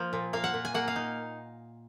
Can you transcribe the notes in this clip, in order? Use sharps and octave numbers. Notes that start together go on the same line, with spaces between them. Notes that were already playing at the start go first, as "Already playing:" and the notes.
Already playing: F3 A#3
A#2
A#3 F5
F#5
A#2
G#5
A#3 F#5
F5
D#4